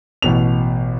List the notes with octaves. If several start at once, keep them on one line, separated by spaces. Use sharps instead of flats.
A1 B2 F7